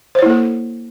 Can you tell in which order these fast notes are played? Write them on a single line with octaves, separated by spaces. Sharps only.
C5 C#5 E4 A#3 A4